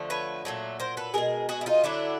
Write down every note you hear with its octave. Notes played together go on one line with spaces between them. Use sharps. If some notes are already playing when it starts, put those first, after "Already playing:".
Already playing: D3 F3 A3
B4 C#5
A#2 F#3 A3
A#4 C5
A4 B4
B2 G#3 G#4 A#4
F#4 G#4
E4
D#4 F4
D3 F#3 A3 D4 E4